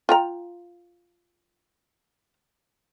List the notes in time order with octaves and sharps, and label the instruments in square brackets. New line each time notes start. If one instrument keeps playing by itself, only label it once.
[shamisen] F4 G5 A#5